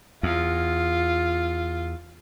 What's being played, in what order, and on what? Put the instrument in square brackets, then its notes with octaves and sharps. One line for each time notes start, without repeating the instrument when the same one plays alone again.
[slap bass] E2 [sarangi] F4